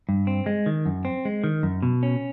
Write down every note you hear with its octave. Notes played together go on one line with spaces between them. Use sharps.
G2
C4
G#3
D#3
F#2
C4
G#3
D#3
F#2
B2
C#4